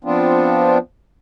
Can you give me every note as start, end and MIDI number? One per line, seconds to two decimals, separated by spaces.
0.04 0.78 53
0.04 0.78 59
0.04 0.78 60
0.04 0.78 62
0.04 0.78 65